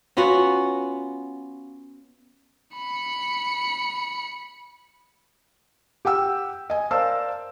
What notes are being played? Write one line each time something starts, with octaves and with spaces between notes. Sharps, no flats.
B3 C#4 F4 F#4
B5 C#7
G4 F#5 G5 E6
D#5 G#5
A#4 C5 D5 F5 A5 E6